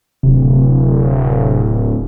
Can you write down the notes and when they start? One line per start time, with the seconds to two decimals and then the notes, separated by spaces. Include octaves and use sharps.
0.23 D1 C3